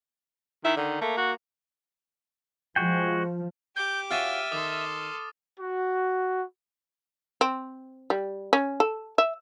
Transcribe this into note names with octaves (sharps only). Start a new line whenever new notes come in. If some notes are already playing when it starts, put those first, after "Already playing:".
D#3 E4
D3 D#3
A3 A#3
F#4
F3 G#3 F#4 G5
G4 D6 G6
C#4 F4 F#4 E5 F6 A6 D#7
D#3 A4 C6 D6 D#6
F#4
C4
G3
C#4
A4
E5